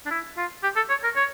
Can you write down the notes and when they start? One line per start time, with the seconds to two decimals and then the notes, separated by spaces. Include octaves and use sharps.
0.06 D4
0.11 E4
0.37 F4
0.63 G4
0.76 A4
0.89 C#5
1.04 A#4
1.16 C#5